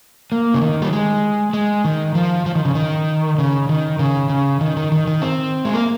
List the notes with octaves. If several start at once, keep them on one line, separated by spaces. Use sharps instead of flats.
A#3
C#3
D#3
G3
G#3
G#3
D#3
F3
F3
D#3
C#3
D#3
C#3
D#3
C#3
C#3
D#3
D#3
D#3
D#3
C4
G#3
A#3